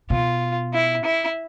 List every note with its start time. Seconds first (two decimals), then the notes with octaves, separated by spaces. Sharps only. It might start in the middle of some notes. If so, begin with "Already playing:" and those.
0.10 B2 F4
0.73 E4
1.05 E4